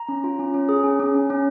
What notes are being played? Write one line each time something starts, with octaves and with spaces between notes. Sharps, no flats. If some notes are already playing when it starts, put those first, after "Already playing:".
Already playing: A#5
C#4
F4
C#4
C#4
G#4
C#4
C#4
C#4
C#4